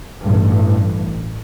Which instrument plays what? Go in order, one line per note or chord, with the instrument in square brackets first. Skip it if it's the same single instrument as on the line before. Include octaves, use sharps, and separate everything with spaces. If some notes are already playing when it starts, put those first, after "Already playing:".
[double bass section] A1 G2